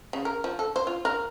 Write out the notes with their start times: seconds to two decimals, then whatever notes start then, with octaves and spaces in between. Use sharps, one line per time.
0.13 C#3
0.25 A#4
0.44 F3
0.59 A4
0.76 C5
0.87 F4
1.05 A#4